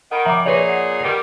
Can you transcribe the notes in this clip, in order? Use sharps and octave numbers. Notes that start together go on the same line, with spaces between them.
D#3 F#5 B5 D7
F3 E5 A#5 D6 F#7
A#2 D#4 G#4 B4 C#5 D5
F#5 C7
D#3 G3